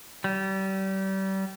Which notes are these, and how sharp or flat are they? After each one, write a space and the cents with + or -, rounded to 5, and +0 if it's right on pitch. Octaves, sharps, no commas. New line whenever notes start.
G3 -30